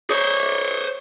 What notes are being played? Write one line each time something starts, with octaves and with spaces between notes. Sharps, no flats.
C5 C#5